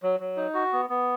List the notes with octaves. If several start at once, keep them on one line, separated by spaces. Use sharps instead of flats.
F#3
F#3
D#4
F#4
B3
B3